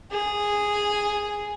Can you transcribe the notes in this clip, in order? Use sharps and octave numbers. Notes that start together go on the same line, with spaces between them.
G#4